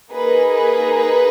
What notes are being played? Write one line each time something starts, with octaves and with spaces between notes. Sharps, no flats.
A#3 D#4 G#4 B4
B4
B4